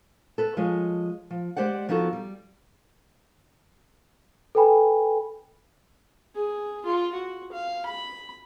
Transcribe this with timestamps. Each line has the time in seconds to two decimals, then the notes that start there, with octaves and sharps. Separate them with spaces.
0.38 A4 B4
0.57 F3 G#3 C#5 D#5
1.30 F3
1.57 G#3 G4 C5 D5 F#5
1.89 F3 B3 D#4 F#4 A4
2.13 G3
4.55 A4 B4 G5 G#5 B5
6.35 G#4
6.86 F4
7.14 F#4
7.52 F5
7.86 B5